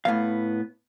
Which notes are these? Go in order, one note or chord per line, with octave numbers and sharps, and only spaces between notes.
A2 B3 F5